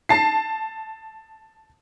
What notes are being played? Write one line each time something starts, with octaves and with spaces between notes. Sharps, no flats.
A5 C7